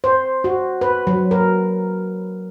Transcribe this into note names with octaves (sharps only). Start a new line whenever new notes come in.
C5
F#4
B4
F#3
A#4